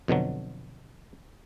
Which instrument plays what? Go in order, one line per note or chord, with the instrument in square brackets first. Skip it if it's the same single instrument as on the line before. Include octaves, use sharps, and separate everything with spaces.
[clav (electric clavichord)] F2 B2 D3 F#3